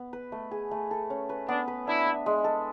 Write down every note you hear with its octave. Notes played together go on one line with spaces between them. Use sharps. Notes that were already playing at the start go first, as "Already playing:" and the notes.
Already playing: B3
B4
A3
G#4
A3
A4
C#4
B4
B3 D4
B4
D4 E4
E5
G#3
A4